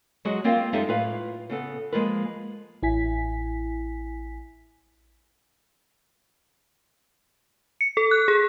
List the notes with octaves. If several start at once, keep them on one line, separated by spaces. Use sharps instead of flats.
F#3 G#3 F#4 G#4 D#5
A#3 C4 F4 A#4 F5 G5
F#2 G#3 D#4 G4 A4 E5
A2 F4 B4 F5
C#3 B3 A4
F3 G#3 A#3 F4 A#4 B4
A1 E4 G#5 B6
C#7
A4
F#6
G#4